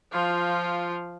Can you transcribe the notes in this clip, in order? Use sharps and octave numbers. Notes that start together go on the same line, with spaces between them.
F3 F4